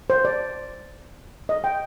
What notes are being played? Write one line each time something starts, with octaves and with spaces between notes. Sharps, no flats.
C5
D5
D#5
G5